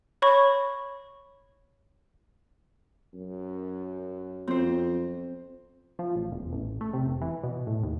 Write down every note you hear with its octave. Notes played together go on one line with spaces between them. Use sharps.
C#5 B5 C#6
F#2
F2 C4 C5
F3
A1
E1
A1
A3
C3
F1
E3
B2
A2
D#2